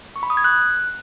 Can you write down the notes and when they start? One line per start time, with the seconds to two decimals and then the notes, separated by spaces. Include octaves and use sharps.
0.16 C#6
0.23 B5
0.30 D#6
0.37 G#6
0.44 F#6